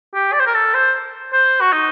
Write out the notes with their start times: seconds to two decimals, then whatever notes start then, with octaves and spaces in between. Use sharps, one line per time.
0.14 G4
0.33 D5
0.40 C5
0.47 A#4
0.54 A4
0.74 C5
1.33 C5
1.61 F#4
1.73 D#4